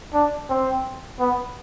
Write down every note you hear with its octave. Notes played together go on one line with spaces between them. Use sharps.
D4
C4
B3